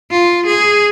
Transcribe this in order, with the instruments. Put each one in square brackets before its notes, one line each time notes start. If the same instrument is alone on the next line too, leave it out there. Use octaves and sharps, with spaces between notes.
[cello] F4
G#4